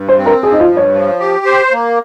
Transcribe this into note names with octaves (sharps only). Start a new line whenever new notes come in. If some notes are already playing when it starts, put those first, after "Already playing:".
Already playing: G2
C5
C4
A#4
F3 G#4
D#4
F4
G2
C#5
F3
G4
C5
A#3